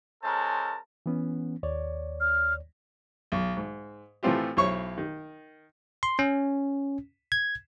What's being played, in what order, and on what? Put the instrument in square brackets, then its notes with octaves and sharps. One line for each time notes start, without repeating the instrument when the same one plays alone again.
[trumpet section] G#3 C#4 A4 A#4 C5 A5
[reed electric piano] E3 B3 C#4
D#2 C#5 D5
[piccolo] F6
[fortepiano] B1
G#2
A2 E3 A3 C4 F4 G4
B1 E4 C5 C#5 C#6
D#3
[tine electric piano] C6
C#4
G#6